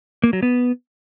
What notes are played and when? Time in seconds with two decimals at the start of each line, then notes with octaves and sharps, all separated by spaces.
0.24 A#3
0.33 F#3
0.43 B3